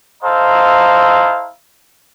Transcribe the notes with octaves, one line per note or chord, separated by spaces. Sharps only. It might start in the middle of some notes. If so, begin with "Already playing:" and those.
E4 A4 C5 D#5 F5 A#5